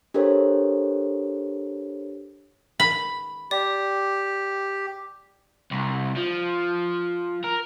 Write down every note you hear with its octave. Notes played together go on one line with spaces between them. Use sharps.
D4 G4 A4 A#4 C5 C#5
B5
G4 D5
C2
F3
A#4